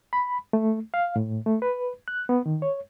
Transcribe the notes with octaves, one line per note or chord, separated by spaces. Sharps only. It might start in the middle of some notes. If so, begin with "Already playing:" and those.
B5
A3
F5
A2
A3
B4
F#6
B3
D#3
C#5